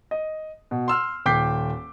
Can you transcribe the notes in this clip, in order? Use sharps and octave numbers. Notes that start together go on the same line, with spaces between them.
D#5
B2
C6 E6 F6
D#1 G5 D6 G6 B6 C7